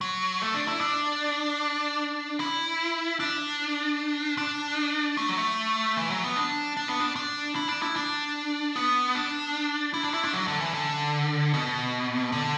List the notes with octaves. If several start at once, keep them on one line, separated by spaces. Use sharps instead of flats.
F#3
A3
D4
E4
D4
E4
D4
D4
A3
F#3
A3
E3
F#3
B3
D4
D4
B3
D4
D4
E4
D4
E4
D4
B3
D4
E4
D4
E4
D4
F#3
D3
E3
D3
B2
D3